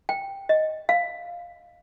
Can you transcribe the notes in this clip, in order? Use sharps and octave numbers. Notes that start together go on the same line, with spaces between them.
G5
D#5
F5